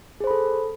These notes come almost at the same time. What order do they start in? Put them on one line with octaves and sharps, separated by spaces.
G#4 C5 B5 A4